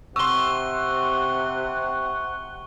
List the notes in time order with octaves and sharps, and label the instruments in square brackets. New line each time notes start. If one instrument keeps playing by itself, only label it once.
[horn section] C3 [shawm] F#5 [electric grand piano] C6 E6 [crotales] C#6 G7